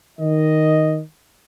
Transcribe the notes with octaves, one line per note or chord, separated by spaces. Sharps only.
D#3 D#5